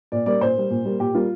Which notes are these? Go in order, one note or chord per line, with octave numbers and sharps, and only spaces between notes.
A#2 D5
G3 A#3 D5
A#2 C5
G3 A#3
A#2
G3 A#3
A#2 G4
G3 A#3 F4